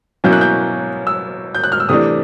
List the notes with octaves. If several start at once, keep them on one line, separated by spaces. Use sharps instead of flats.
B2 F#3 A#3 C#4 E4 G6
F#6
G6
E6
G6
F#6
F6
E6
C3 E3 A3 D4 D#6